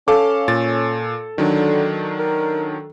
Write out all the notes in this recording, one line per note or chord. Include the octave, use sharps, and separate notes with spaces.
C#4 A4 F5 D6
A#2 A6
D3 D#3 F#3 D4
A#4